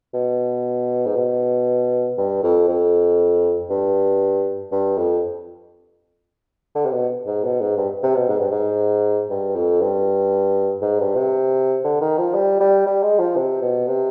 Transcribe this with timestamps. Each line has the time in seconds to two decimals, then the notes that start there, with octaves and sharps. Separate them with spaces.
0.14 B2
1.06 G#2
1.16 B2
2.18 G2
2.43 F2
2.69 F2
3.70 G2
4.72 G2
4.98 F2
6.75 D3
6.85 C3
6.92 B2
7.26 G#2
7.44 B2
7.60 G#2
7.77 G2
8.03 C3
8.16 B2
8.28 G#2
8.40 G2
8.51 G#2
9.30 G2
9.55 F2
9.81 G2
10.82 G#2
10.99 G2
11.17 C3
11.84 D3
12.01 D#3
12.18 F3
12.34 G3
12.60 G3
12.86 G3
13.03 G#3
13.19 F3
13.36 C3
13.62 B2
13.88 C3